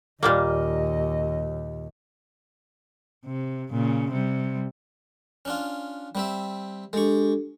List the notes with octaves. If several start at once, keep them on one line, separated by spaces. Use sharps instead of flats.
D#2 A#2 G3 A#3 D#5
C3
A#2 C#3
C3 G3
C#4 D4 F4
G3 C4 E5
G#3 D4 G4 A4 C#6